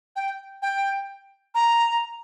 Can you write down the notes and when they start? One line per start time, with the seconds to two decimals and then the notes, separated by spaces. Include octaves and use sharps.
0.16 G5
0.62 G5
1.55 A#5